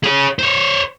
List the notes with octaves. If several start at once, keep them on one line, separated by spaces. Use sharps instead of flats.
G#4 C#5
C5 C#5